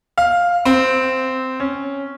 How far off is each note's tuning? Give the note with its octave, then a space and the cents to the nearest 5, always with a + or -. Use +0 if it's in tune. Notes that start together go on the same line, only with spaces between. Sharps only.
F5 +5
C4 -10
C#4 +0